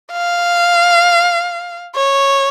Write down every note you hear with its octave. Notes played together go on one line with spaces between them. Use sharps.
F5
C#5